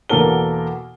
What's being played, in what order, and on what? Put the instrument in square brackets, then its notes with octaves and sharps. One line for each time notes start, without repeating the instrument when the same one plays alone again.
[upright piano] E2 B2 A#3 A4 A#4 G7